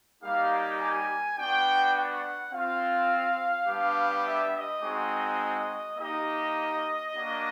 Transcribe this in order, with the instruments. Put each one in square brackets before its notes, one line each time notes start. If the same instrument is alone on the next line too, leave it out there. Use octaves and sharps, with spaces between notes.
[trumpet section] G3 A#3 D#4 G4 F5
G#5
B3 D4 F#4 G5
F#5
C4 F4 F5
G3 B3 D4 G4
E5
D#5
G#3 C4 D#4 F#4
A#3 D#4 G4 D#5
A#3 D4 F#4